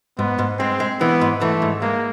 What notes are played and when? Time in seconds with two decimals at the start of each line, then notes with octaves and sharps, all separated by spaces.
0.18 G#2 B3
0.39 G#2
0.59 G#3 C4
0.80 G#3
1.00 E3 B3
1.21 G#2
1.41 E3 A3
1.62 G#2
1.82 G#3 A#3